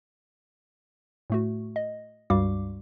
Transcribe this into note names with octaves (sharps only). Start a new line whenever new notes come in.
A2 A3 F#4
D#5
C#2 G2 G3 F#4 F5 D6